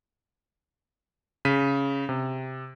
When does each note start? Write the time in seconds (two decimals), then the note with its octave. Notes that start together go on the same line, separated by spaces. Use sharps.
1.45 C#3 B6 D#7
2.09 C3